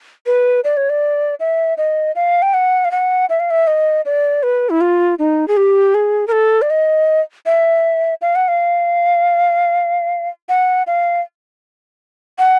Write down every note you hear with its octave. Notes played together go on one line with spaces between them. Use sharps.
B4
D5
C#5
D5
E5
D#5
F5
G5
F#5
F5
F#5
E5
F5
E5
D#5
D5
B4
E4
F4
D#4
G#4
G4
G#4
A#4
A4
D5
D#5
E5
F5
F#5
F5
F#5
F5
F#5